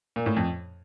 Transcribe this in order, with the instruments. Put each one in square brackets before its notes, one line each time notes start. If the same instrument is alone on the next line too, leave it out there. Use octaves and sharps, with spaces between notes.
[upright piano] A#2
A2
F2